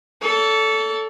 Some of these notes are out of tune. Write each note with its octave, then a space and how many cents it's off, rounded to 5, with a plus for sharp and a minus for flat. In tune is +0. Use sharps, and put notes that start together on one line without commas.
A4 +0 C#5 +45